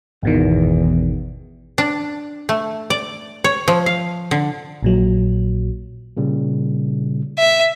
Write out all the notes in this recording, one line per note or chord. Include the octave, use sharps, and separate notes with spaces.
G#1 E2 B2 D#3
D4
A3
D5
C#5
F3
F5
D3
A#1 A#2 F#3
A#2 C#3 G3
E5